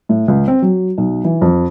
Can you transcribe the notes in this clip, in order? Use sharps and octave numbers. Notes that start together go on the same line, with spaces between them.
A2
C#2
C4
F#3
B1
E3
F2